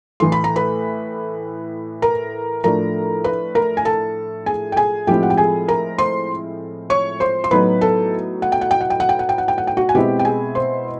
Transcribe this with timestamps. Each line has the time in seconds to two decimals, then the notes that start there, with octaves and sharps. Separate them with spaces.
0.20 A2 E3 A3 C6
0.32 B5
0.44 A#5
0.56 B4 B5
2.02 A#4 A#5
2.64 A2 F3 A3 D4 A#4 A#5
3.24 B4 B5
3.55 A#4 A#5
3.77 G#5
3.85 A4 A5
4.46 G#4 G#5
4.72 G5
4.77 G#4 G#5
5.07 A2 F3 G#3 C4 E4 G4 G5
5.23 F#5
5.30 G5
5.37 G#4 G#5
5.68 A#4 A#5
5.98 C5 C6
6.90 C#5 C#6
7.20 C5 C6
7.44 C6
7.51 A2 F#3 B3 D#4 B4 B5
7.81 A4 A5
8.42 F#5
8.52 G5
8.61 F#5
8.71 G5
8.81 F#5
8.90 G5
9.00 F#5
9.09 G5
9.19 F#5
9.29 G5
9.38 F#5
9.48 G5
9.58 F#5
9.67 G5
9.77 F#4 F#5
9.89 G#5
9.95 B2 G#3 C4 E4 G4 G5
10.19 G5
10.25 G#4 G#5
10.55 C5 C6